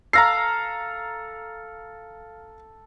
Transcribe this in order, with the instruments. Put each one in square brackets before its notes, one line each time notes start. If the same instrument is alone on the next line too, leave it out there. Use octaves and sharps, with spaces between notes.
[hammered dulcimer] A4 F5 [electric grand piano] A#5 A#6 C7